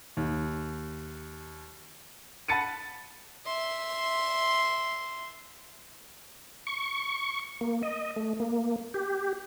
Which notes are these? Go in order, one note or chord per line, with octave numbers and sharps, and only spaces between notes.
D#2
F#5 A5 B5 A6 C#7 D#7
E5 C6
C#6
A#3
D#5
A3
A#3
G4